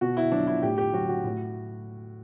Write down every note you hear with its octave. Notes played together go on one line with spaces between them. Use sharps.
B2 F#4
E4
F#3 D4
E4
A2 G4
G4
F#3 F#4
F#4
A2